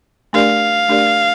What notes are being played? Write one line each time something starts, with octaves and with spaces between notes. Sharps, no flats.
A3 D4 G4 A#4 D5 F5
A3 D4 G4 A#4 D5